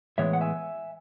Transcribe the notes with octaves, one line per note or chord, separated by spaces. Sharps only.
A2 E3 G#3 B3 C#5 E5
F#5
E5 G#5